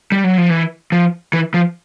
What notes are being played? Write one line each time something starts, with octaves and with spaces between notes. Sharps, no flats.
G3
F#3
F3
E3
F3
E3
F3